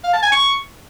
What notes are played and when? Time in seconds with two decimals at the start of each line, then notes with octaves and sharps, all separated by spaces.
0.04 F5
0.13 A5
0.23 G#5
0.32 C#6